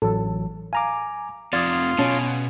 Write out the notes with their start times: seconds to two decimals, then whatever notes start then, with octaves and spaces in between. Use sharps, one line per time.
0.02 A1 F#3 A4
0.73 F5 G#5 A#5 D6
1.53 F2 C3 F4 D5 D#6 G#6 A6
1.99 B2 C#4 A5